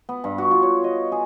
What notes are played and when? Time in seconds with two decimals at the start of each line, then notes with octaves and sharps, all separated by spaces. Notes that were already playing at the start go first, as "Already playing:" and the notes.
0.09 B3
0.24 G2
0.38 F#4
0.51 F4
0.63 C#5
0.84 D#5
1.12 G#4